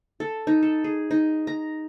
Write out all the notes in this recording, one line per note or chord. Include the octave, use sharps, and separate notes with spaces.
A4
D#4
A4
G#4
D#4
A#5